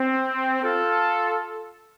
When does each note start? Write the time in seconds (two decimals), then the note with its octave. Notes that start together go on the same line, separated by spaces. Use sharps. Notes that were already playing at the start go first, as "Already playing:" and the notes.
Already playing: C4
0.63 F4 A4